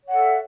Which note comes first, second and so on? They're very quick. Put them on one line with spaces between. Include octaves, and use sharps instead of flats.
C#5 F#5 A4 E5